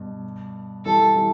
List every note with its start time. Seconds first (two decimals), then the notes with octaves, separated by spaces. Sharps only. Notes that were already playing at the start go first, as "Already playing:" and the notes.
Already playing: G2 B2
0.85 E3 G3 A4
1.15 E3 G3